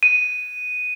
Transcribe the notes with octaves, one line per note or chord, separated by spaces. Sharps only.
D#7